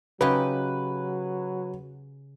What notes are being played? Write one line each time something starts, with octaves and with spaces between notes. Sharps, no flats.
C#3 F#3 D#4 G4 B4